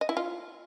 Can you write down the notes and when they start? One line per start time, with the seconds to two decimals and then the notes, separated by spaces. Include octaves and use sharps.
0.01 D#5
0.09 E4
0.17 F4